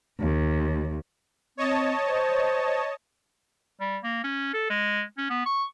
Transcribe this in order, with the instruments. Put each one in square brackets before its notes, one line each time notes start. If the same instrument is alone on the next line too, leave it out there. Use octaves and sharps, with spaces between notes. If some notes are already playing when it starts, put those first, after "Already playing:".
[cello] D#2
[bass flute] C4 [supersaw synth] C#5 D#5 A5
[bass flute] C5
[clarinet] G3
A#3
C#4
A4
G#3
C#4
B3
C#6